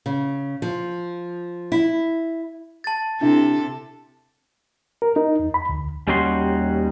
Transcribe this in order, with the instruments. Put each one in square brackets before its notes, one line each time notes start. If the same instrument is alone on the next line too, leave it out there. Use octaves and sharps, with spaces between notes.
[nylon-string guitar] C#3
F3
E4
[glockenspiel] A5 A6
[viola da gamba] C3 A4 [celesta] D4 E4 E5
[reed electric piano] A#4
D#4
E2
B5
D2
[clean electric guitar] D#2 G3 C#4 D#4 F#4 C6